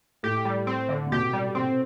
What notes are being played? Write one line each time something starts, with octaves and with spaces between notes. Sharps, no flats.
A2 G4
G3
C4
D3
C3
B2 G4
G3
C3 C4